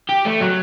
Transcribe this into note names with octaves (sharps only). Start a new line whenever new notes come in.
G4
A3
F#3